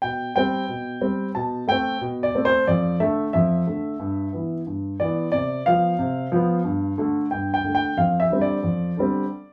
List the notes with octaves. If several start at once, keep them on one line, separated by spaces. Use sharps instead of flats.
B2 G5
G3 C4 G5
B2
G3 C4
B2 A5
A3 C4 G5
B2
D5
A3 C4
C5
F2 D5
D3 A3 E5
F2 E5
D3 A3
G2
E3 B3
G2
E3 B3 D5
C3 D5
F3 B3 F5
C3
F3 B3
G2
D3 A3
G2 G5
G5
D3 A3
G5
F2 F5
E5
D3 G3 C4
D5
F2
D3 G3 C4